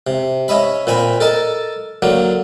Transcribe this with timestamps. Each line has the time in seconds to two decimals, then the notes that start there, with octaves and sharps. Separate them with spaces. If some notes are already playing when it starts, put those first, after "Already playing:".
0.07 C3
0.48 C#4 C#5 D#5 E5 B5
0.87 A#2 C4 G#5 B5
1.20 A4 A#4 D#5 A5
2.02 D3 F#3 A#3